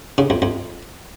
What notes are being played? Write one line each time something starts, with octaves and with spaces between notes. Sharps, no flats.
C#3
F2
F2